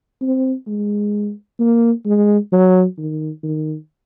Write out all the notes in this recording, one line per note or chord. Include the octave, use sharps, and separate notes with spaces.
C4
G#3
A#3
G#3
F#3
D#3
D#3